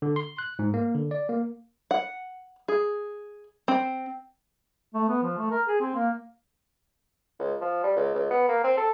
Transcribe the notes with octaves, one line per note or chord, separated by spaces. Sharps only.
D3
C6
F#6
G#2
A#3
D3
D5
A#3
F#5
G#4
C4
A3
B3
F3
A3
A#4
G#4
C4
A#3
C#2
F3
G3
C#2
C#2
B3
A#3
C4
A4